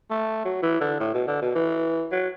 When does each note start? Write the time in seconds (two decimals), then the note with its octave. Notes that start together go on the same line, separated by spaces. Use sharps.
0.11 A3
0.45 F#3
0.62 E3
0.81 D3
1.00 A2
1.14 B2
1.27 D3
1.42 B2
1.55 E3
2.12 F#3